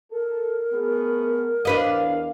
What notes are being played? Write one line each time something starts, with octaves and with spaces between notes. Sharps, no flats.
A4 A#4
A3 B3 G#4
E2 D4 B4 D#5 F5